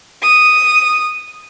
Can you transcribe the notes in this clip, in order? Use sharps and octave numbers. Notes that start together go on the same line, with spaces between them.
D#6